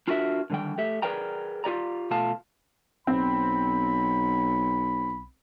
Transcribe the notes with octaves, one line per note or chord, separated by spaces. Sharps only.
D4 F4 F#4 A#4 D#5 E5
D3 D#3 F3 G3 G5
A3 G4 E5
G#4 A#4 B4 D5 G5 A#5
F4 G4 D5 A#5
B2 A3 F4 F5 A5
B1 C4 B5